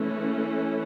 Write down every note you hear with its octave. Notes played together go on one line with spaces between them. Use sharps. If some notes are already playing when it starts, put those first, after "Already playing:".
Already playing: E3 A3 C#4